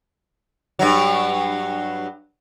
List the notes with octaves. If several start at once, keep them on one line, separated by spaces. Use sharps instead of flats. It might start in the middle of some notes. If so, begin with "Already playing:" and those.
G2 F#3